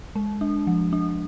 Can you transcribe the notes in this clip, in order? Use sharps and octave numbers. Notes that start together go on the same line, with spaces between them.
G#3
D4
F3
D4